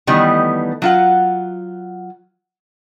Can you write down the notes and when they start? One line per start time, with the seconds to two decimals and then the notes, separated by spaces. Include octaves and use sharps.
0.07 D#3 E3 G3 A3 B3 D#4
0.82 F#3 F4 F#5